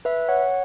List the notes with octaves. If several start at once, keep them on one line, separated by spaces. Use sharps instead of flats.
B4 E5
C#5 F#5